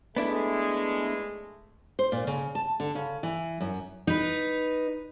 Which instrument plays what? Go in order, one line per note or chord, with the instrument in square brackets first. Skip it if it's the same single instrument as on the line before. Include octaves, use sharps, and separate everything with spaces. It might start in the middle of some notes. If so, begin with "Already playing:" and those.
[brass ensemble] G#3 A3 [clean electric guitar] B3 D4 E4
[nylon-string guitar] C5
A#2
C#3
A5
D3
C#3
E3
F#2
[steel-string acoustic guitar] D#4 B4